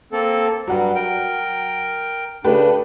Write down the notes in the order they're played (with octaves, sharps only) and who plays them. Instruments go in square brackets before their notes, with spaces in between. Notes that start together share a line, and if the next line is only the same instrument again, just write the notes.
[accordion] A#3 C4 A4
[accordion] G2 G3 [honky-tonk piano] F#3 F#5
[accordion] A#4 G5
[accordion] C#3 D4 [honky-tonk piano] A3 G4 B4